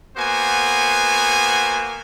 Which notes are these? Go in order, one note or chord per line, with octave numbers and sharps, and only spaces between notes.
A#3 B3 F#4 C5 G#5